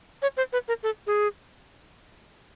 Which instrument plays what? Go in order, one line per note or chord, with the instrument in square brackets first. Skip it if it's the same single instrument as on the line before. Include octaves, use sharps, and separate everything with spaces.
[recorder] C#5
C5
B4
A#4
A4
G#4